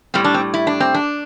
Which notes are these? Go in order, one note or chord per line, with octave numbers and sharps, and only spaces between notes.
A2 G3 C4
D4
C4
E4
D4
C4
D4